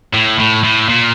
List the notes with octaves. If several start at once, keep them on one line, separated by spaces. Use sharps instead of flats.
A2
A2
A2
A#2